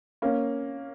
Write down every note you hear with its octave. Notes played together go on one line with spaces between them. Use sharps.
A#3 C#4